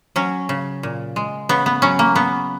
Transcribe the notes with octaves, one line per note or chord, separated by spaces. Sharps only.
F#3 C#4
C#3
A#2
G#3
C#3 B3
B3
F#3 C#4
A#3
C#3 B3